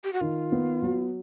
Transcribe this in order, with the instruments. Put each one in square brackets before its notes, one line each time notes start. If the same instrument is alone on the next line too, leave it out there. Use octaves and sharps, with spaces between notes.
[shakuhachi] G4
F#4
[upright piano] D#3 [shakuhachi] F4
[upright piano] B3
F#3